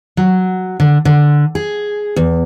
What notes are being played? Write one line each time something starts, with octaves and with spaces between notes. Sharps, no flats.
F#3
D3
D3
G#4
E2